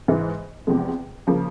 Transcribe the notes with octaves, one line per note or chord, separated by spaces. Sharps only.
G#2 E3 G#3
E2 C3 F3 G#3
C#3 F3 A#3